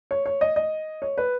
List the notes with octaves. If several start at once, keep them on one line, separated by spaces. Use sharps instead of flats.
C#5
C#5
D#5
D#5
C#5
B4